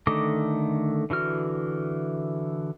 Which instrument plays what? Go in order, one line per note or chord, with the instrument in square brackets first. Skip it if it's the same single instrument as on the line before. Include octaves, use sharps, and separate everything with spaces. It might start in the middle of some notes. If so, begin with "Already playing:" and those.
[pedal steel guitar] D3 D#3 A3 D#5 D6
D3 E3 F#4 F6